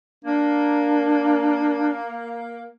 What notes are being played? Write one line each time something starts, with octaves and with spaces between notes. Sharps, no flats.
A#3 D4